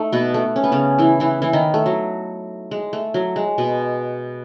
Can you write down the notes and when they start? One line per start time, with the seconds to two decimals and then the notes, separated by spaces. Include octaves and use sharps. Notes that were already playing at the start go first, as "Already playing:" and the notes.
Already playing: A3 D#4
0.12 B2 B3
0.34 A3
0.56 C#4
0.64 B3
0.72 C#3 C#4
0.98 E3 E4
1.20 E3 E4
1.42 E3 E4
1.53 D#3 D#4
1.74 A3
1.86 F#3
2.71 G#3
2.93 A3
3.14 F#3
3.36 G#3
3.58 B2 B3